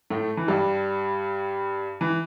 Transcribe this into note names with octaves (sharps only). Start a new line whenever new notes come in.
A2 A3
E3
G2 G3
E3